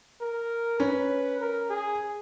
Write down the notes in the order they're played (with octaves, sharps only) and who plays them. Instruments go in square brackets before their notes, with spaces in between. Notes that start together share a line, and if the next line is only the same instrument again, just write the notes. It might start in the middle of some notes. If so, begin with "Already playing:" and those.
[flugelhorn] A#4
[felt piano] C#4 [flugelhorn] B4
[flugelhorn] A#4
G#4